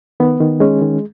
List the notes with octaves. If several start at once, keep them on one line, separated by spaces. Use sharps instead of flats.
D#3 B3
D#3
G#3 C#4
D#3